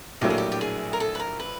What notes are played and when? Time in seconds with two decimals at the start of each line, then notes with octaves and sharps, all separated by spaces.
0.21 A#1 A2 F#3 A#3 D4 G4
0.30 G#4
0.38 G4
0.52 G4
0.61 G#4
0.93 A#4
1.00 A4
1.15 B4
1.20 A#4
1.40 B4